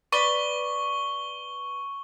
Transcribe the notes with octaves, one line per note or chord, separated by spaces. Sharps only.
B4 D5 B5 C#6 G7